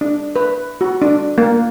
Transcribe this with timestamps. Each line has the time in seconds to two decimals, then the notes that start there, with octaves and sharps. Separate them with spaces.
0.01 D4
0.36 B4
0.81 F#4
1.02 D4
1.38 A#3